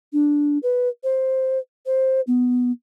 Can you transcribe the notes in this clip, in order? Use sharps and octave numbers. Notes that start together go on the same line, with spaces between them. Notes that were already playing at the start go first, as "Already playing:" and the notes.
D4
B4
C5
C5
B3